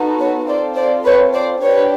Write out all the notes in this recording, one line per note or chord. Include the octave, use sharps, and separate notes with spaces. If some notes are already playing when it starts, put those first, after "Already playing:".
Already playing: B3 D#4 F#4 A4
B4 C#5
C4 F4 A4 C5 D5
C5 D5
B4 C#5
C5 D5
D4 G4 B4 C#5